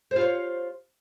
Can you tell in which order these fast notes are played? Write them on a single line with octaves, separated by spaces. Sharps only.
C5 F4 C#5